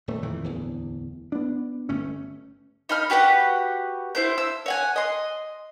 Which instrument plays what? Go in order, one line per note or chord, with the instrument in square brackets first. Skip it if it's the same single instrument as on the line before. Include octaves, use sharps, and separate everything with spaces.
[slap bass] D#1 A3
F2 A#2 D#3 E3
D1 E2
B3 D4
G1 A3 C#4
[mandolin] D#4 B5 F6
F#4 G4 B4 F#5
E4 C5 G6
E6
C#5 F#5 G#5
D#5 C6